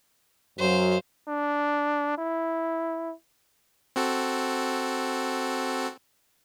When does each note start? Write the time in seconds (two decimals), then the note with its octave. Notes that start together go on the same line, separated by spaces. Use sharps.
0.58 F#2 F#3 C5 F5
1.27 D4
2.18 E4
3.96 C4 F#4 A4